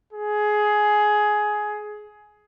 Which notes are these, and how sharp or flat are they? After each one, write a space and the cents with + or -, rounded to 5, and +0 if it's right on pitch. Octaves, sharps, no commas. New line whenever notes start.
G#4 +15